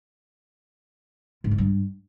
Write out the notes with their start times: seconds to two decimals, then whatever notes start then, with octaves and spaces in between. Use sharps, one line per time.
1.44 G#2
1.51 F3
1.58 G2